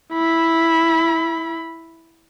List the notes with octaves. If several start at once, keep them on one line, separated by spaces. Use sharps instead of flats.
E4 B5